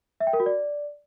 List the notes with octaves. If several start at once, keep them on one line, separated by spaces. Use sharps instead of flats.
E5
G5
A#4
F#4
D5